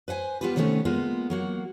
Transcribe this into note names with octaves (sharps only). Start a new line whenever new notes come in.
B4 C5 F#5 G#5
G3 B3 F4 G4 B4
C3 D#3 G3 A3 B3 C#4
G#3 A#3 B3 F4
F#3 A#3 F#4